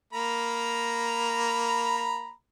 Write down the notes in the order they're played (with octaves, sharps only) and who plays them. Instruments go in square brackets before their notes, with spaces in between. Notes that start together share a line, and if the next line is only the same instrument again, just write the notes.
[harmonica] A#3 A#5 B5